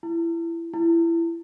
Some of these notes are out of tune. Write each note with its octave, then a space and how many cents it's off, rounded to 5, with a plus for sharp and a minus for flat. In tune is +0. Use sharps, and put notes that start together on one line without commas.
E4 +20
E4 +20